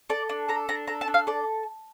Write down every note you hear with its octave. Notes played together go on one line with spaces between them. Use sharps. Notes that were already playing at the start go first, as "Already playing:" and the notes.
A4 D5
D4
A4 A#5
D4 A#5
A4 A#5
A5
D4
F5
A4 D5